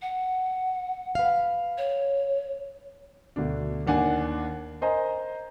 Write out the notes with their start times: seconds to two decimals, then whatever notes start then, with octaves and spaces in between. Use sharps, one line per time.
0.02 F#5
1.15 B4 F5
1.78 C#5
3.36 D2 B2 D4
3.87 D#2 D4 F#5 G#5
4.81 A#4 C5 D#5 G#5 A#5